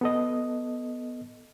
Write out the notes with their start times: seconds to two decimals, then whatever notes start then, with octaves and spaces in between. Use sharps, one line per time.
0.01 B3 A4 D#5